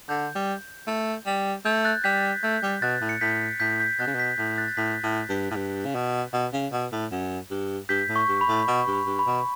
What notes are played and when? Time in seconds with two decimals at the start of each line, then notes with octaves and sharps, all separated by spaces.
0.09 D3 G6
0.35 G3
0.87 A3
1.26 G3
1.65 A3 G6
1.85 F#6 A6
2.04 G3 G6 B6
2.43 A3 G6
2.63 G3
2.82 B2 F#6 A6
3.01 A2
3.09 C#7
3.21 A2 G6 B6
3.60 A2 G6 B6
3.80 G6 B6
3.99 B2 F#6 A6
4.07 C#3
4.15 B2 G6 B6
4.38 A2 G6 B6
4.58 F#6 A6
4.68 A6
4.77 A2 G6 B6
5.03 A2
5.30 G2
5.51 A2
5.56 G2
5.85 C#3
5.95 B2
6.33 B2
6.53 C#3
6.73 B2
6.92 A2
7.12 F#2
7.51 G2
7.89 G2 G6 B6
8.09 A2
8.16 C#6
8.28 G2
8.41 B5
8.48 A2
8.68 B2 C#6
8.87 G2
8.93 B5
9.07 G2
9.19 B5
9.26 B2